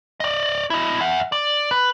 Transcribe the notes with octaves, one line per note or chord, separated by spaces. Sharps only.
D5 D#5
E4 D#5
E5 F#5
D5
B4